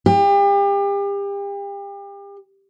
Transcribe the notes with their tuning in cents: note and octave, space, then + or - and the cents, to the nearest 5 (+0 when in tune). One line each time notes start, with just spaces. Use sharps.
G4 +35